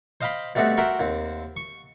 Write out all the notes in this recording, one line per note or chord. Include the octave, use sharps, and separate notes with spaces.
C5 D#5 F5 G5 B5 C6
B2 G3 A3 C4 F#4
F#4 A#4 C5 E5 G5
D#2 C4
C#6